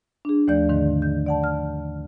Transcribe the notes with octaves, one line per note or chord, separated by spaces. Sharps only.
D4 G#4
D#2 F3 A3 D5 G6
G#2 D3 D#3
G6
D5 F#5 A5
F6